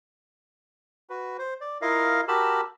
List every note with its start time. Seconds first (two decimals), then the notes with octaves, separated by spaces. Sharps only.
1.10 F#4 B4
1.39 C5
1.61 D5
1.82 E4 F4 A#4 D#5 F5
2.28 F#4 G4 A#4 A5 B5 E6